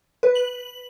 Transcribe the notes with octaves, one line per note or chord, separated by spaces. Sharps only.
B4
F#7